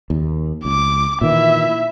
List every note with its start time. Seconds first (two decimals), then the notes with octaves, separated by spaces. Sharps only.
0.10 D#2
0.65 C#2 D6
1.21 A#2 D#3 E3 E4 E5